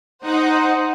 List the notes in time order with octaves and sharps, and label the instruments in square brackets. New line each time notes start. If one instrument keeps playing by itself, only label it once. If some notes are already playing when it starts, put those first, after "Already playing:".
[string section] D#4 C5 F#5